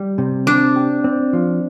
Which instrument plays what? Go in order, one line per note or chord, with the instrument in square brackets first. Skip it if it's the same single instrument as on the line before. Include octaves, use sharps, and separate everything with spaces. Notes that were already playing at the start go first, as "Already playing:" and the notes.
Already playing: [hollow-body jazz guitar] G3
C3
[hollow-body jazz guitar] C4 [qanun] D4
[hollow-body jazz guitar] G4
C4
F3